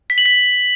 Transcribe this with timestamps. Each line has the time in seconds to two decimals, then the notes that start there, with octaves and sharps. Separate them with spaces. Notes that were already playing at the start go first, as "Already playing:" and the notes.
0.10 B6
0.18 F#7
0.26 B6